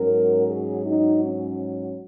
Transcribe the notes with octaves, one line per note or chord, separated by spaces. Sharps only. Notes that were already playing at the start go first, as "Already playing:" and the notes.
Already playing: G#2 F#3 C#4 A#4
G#4
D#4
C#4